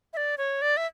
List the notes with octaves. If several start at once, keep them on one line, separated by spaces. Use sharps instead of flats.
E5
D5
C#5
D5
E5